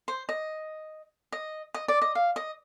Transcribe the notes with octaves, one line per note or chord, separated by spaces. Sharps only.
C5
D#5
D#5
D#5
D5
D#5
F5
D#5